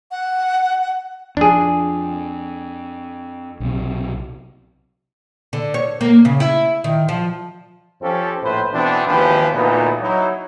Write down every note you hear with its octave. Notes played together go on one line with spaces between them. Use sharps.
F#5
F2 D4 G#4
B1 C3
D3
C#5
A#3
C#3
E4
D#3
F3
F2 F3 C4 C#4 G4 A4
A#1 A2 B4 C5
B2 E3 B3 C4 D4
G#1 D#2 E3 F3 G4 B4
D2 A#2 E3 B3 D#4 B4
F#3 D#4 E4